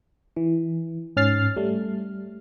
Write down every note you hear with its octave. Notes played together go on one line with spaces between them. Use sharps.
E3
G#2 C#4 F6 A6 C7
G3 A3